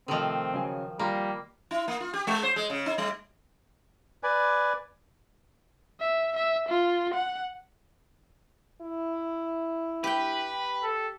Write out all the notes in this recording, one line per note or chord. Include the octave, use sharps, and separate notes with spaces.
C3 D#3 F3 A3 C4 D#5
C#3 F#3 G#5
G3 A#3 F4 A#5 C6
E4
A#3
F4
G4
G#3
C5
G#3
C#3
D#4
G3
B4 D5 G#5
E5
E5
F4
F#5
E4
G4 B4 G5
A4